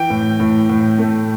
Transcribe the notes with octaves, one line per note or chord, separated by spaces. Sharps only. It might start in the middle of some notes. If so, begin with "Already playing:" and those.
Already playing: E3 G5
A2
A2
A2
A3